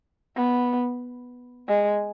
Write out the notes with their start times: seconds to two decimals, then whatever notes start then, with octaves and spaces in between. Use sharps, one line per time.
0.37 B3
1.68 G#3